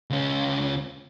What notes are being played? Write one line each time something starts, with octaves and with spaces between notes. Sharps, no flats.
C#2 C#4